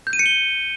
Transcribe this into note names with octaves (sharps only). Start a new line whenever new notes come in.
G6
D#7
C#7
G7